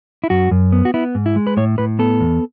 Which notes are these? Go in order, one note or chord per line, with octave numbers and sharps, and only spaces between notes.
E4
F#2 F#4
F#2
B3
F#4
B3 E4
G#2
E4
G#3
B4
A2 C#5
A2 B4
B3 A4
E2